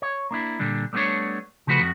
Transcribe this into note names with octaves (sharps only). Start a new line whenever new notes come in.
C#5
A#3 D4 E4
A#2 D3 G3 D4
G3 A3 B3 C#4 D4 C#5
C#3 F3 A3 F#4 B4
F2 F#4